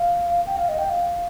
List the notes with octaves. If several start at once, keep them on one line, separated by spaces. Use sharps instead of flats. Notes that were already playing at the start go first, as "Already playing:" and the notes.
Already playing: F5
G5
F5
D#5
G5
F5